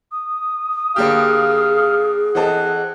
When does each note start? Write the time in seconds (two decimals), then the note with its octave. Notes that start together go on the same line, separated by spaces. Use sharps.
0.12 D#6
0.96 D3 A#3 G4 G#4 F5
2.35 E3 C4 A4 D#5 F#5